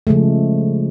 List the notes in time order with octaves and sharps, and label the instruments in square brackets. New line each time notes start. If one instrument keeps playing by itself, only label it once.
[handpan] C#3 F3 G#3 A3